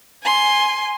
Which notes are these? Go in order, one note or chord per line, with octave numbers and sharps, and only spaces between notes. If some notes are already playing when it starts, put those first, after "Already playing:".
G#5 C6